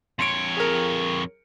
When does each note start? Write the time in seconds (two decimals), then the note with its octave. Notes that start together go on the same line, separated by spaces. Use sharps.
0.19 F2 C#5 C6 C#7 D7
0.57 G#4 A#4